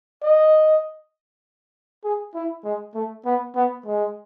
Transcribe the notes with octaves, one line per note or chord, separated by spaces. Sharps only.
D#5
G#4
E4
G#3
A3
B3
B3
G#3